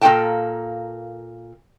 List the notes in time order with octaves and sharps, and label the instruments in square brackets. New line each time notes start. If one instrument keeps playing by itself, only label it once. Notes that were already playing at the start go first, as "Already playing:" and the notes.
[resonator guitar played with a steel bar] A#2 A#3 D#4 A4 G5 A5